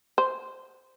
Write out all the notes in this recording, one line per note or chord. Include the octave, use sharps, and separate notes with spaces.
C5